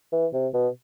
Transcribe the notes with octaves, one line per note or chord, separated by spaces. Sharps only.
E3
C3
B2